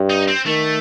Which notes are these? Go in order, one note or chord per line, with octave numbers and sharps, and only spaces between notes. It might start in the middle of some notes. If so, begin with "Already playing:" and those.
Already playing: G2
D#4
C4
D#3 A3